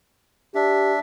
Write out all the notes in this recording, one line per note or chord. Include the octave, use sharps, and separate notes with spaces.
D4 G4 E5